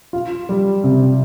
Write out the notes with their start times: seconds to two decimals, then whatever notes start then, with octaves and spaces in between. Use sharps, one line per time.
0.13 F4
0.49 G3
0.84 C3